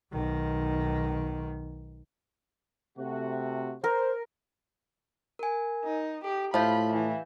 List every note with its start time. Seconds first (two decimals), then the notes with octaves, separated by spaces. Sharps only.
0.12 B1 D#3
2.98 C3 A3 F#4
3.84 A#4 C5 A#5
5.39 A#4 G#5
5.84 D#4
6.24 G4 A4
6.54 A2 F3 F4 E5 F5 B5 G6
6.93 E3